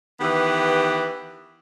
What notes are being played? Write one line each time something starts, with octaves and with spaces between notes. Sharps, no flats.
D#3 E3 B3 G4